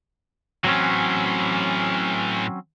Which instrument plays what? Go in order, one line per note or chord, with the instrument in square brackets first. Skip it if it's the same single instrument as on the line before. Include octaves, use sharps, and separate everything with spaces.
[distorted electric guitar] A2 E3 [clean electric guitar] F#3 C4 C#4